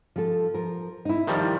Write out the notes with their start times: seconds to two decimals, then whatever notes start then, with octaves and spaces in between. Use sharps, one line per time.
0.16 F3 A4
0.54 F3 A#4
1.05 D#4 E4
1.27 D#3 F3 G3